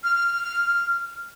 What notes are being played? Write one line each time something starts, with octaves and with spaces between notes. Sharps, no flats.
F6